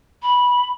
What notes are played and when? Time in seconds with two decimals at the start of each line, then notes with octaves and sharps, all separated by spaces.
0.22 B5